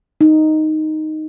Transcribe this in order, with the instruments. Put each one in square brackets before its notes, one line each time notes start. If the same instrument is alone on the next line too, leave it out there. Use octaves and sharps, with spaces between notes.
[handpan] D#4